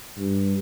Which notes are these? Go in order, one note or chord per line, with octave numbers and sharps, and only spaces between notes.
G2